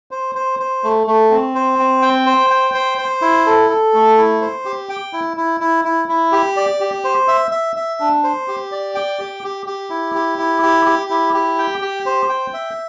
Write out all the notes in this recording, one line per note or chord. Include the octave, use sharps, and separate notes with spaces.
C5
C5
C5
A3
A3
C4
C5
C4
G5
C5
G5
C5
C5
E4
A4
A4
A3
E4
C5
G4
G5
E4
E4
E4
E4
E4
G4
D5
G4
C5
E5
E5
E5
D4
C5
G4
D5
G5
G4
G4
G4
E4
G4
E4
G4
G4
E4
G4
G5
G4
C5
G5
E5